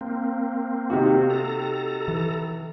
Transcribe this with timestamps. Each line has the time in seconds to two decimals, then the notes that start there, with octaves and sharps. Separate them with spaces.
0.01 A#3 C4
0.90 C3 D#3 F#4
1.30 A4 A#5
2.08 E3